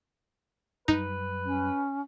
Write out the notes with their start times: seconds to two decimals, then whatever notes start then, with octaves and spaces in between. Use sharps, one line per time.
0.88 F#2 G3 D#4 B4
1.45 C#4